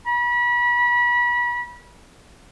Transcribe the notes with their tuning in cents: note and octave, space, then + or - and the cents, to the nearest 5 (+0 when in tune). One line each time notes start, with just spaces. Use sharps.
B5 -30